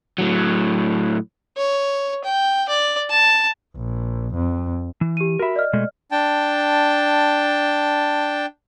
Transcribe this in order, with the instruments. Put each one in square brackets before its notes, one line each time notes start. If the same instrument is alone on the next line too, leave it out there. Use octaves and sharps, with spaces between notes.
[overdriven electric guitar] A2 F#3
[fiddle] C#5
G5
D5
A5
[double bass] A#1
F2
[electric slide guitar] E3
[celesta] G4 D#7
[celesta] F#4 B5 [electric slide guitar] A#4 E5
[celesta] D5 D#5 F6
[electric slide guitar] B2 G#3 A3
[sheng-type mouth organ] D4 G5 A5